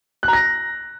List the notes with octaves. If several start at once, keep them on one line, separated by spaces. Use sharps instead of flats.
F#6
A#5
A#6